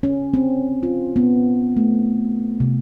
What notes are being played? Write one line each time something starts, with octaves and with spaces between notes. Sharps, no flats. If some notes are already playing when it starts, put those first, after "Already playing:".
C#4
C4
F4
B3
A3
C3